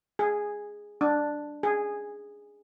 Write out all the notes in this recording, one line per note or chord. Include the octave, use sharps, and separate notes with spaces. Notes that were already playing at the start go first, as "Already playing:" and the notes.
G#4
D4
G#4